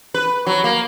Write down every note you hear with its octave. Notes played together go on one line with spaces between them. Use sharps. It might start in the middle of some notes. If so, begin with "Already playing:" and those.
B4
F#3
A#3